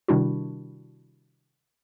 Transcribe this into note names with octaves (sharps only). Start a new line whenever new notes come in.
C3 D#3 G3 D4 E4 F#4